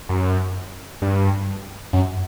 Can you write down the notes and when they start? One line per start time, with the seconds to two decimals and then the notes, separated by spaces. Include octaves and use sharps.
0.09 F#2
1.02 G2
1.93 F#2